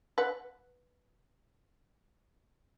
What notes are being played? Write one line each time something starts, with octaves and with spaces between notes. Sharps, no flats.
B4 F#5